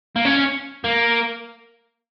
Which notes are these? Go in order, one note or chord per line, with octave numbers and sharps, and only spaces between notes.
A#3
C#4
A#3